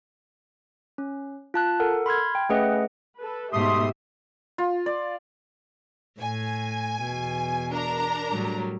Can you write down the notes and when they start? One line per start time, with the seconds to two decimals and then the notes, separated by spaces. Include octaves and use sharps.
0.98 C#4
1.54 F4 A5 F#6
1.80 A4 A#4 F#5
2.06 B5 C6 F6 G#6
2.35 G5
2.49 A3 C#4 G#4 B4 D#5 F#5
3.19 A4 B4
3.53 G#2 B2 A3 G4 E5 C6 D#6
4.58 F4
4.86 D5
6.21 A2 G#5
7.04 E2 B2
7.72 D4 A#4 A#5
8.31 A2 F#3 G3